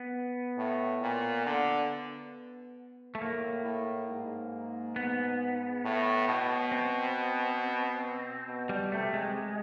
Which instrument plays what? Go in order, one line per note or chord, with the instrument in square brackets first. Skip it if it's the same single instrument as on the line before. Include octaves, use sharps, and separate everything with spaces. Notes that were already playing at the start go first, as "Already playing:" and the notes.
Already playing: [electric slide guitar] B3
[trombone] A2
A#2
D3
[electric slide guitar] A3
[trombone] A2 [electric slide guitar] A#3
[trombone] A2
G#2
[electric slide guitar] B3
[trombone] A2
B2
[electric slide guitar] C4
[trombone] B2
[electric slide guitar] G3
[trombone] C3 [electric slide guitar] A3
[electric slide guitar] G#3